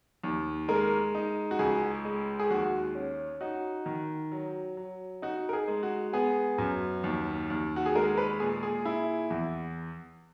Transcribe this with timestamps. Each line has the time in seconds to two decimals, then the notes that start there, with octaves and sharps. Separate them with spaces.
0.24 D#2
0.68 G#3 A#4
1.15 D#4
1.51 F#4
1.59 C#2 G#4
2.05 G#3
2.39 G#4
2.50 D#2 F#4
2.95 C#4
3.41 D#4 F#4
3.86 D#3
4.32 F#3
4.77 F#3
5.22 D#4 F#4
5.49 A#4
5.53 G#4
5.68 G#3
5.83 F#4
6.13 B3 G#4
6.58 F#2
7.04 D#2
7.50 D#2
7.76 F#4
7.86 G#4
7.95 G#3 A#4
8.17 B4
8.40 A#2 G#4
8.63 G#4
8.85 E4
9.30 E2